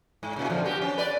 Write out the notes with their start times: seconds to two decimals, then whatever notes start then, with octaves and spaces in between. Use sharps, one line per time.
0.23 G#2
0.36 A#2 C#3
0.50 F2 D3 F3
0.64 B3 F#4 G4
0.81 C#4
0.98 B4 D5